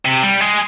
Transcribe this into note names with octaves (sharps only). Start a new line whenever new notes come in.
C3
G3
G#3